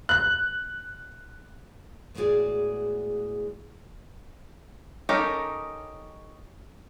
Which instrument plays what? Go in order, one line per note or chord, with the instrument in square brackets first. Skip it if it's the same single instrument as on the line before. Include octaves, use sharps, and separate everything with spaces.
[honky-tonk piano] F#6
[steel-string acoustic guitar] E2 A2 G#3 F#4 G#4 D5
[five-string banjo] C#4 D#4 G4 A4 A#4